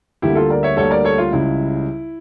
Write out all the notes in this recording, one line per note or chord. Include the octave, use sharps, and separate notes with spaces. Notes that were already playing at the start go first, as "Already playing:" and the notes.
D2 D3 G3 A#3 E4 G4
F4 A4
A#4 D5
C#5 E5
D2 D3 G3 A#3 A4 C#5
A#4 D5
A4 C#5
F4
C#2 C#3 G3 E4